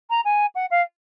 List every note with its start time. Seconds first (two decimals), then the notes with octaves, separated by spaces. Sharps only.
0.10 A#5
0.25 G#5
0.55 F#5
0.71 F5